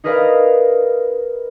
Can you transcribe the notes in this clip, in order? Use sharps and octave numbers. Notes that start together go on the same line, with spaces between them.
D#4 G#4 A#4 B4 D5 F5